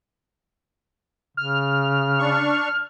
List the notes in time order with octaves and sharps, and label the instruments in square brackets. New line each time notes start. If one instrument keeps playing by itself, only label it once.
[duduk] C#3 [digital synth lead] F6
[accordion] D4 C#6